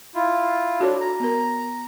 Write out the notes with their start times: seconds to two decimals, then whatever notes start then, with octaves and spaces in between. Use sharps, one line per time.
0.15 E4 F4
0.80 D4 F#4 A4 C#5
1.01 A#5
1.20 B3 A#4